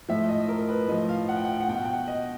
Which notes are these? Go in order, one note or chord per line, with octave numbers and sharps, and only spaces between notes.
A2 F3 E5
D#5
A#4
B4
A2 F3 D#5
F5
F#5
G5
F#5
G5
F#5
B2 G5
F#5
G5
F#5
D#5